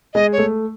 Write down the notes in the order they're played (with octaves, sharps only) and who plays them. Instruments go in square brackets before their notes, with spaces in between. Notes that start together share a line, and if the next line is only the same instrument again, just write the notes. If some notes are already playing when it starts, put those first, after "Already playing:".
[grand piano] G#3 [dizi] D#5
[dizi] C#5
[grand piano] A3